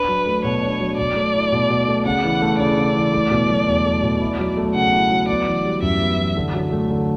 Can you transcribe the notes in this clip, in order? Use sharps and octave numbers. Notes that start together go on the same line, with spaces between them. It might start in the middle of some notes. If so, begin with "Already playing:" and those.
Already playing: D4 B4
F#3
A3
B2 C#5
D4
F#3
B2 D5
A3
E4
B2
B2
A3
C#3 F#5
E3
A3
C#3 D5
C#3
E3
A3
B2
F#3
E2
A3
B2
E4
F#3
A3
C#3 F#5
E4
F#3
B3 D5
E3
G3
F#2 E5
B3
E3
D3
F#3
A3
D3